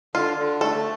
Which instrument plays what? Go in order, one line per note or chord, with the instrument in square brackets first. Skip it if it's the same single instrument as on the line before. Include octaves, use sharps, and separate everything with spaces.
[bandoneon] D3 [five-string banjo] F4
[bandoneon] D3
[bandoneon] A3 [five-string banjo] A4